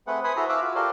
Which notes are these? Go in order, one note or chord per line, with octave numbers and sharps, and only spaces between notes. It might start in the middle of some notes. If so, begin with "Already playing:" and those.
A3 C4 G#4 B4 F#5
B4 C5 G#5 B5 D#6
E4 F#4 G#4 A4 C5 A#5
E5 F5 D6 E6 F#6
F4 F#4
F4 G4 A4 A#4 C5 D5